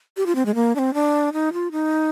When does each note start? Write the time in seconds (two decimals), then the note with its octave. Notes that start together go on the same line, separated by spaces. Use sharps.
0.17 G4
0.26 F4
0.35 C4
0.46 G#3
0.55 A#3
0.75 D4
0.79 C4
0.94 D4
1.33 D#4
1.53 F4
1.72 D#4